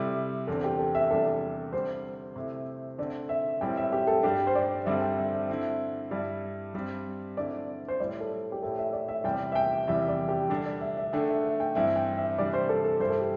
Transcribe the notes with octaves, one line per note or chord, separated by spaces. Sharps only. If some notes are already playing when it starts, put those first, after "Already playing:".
Already playing: C3 G3 E4 A4
E2 D3 C4 A4
G4
A4
E5
E2 C3 E3 G3 D4 A4
D3 G3 C4 C5
C3 A3 E4
D3 A3 C4 D5
E5
A2 G3 C4 E4 G5
E5
G4
A4
G2 G3 D4 G4
C5
D5
G2 D3 G3 C4 E5
G5
E5
E5
D3 C4 E4 E5
G2 G3 E4
G2 G3 C4
D3 C4 E4 D5
C5
A2 G3 E4 D5
A4
G4
A2 A3 E4 A4
E5
D5
E5
E2 C3 E3 G3 G5
E5
G5
E2 C3 E3 G3 E5
D5
G4
D3 G3 D4
D5
E5
E5
D3 A3 D4 G5
E5
E5
G5
G2 E3 C4 E4 E5
G5
E5
C3 E3 G3 D4 D5
C5
A4
A4
G2 G3 E4 C5
A4
G4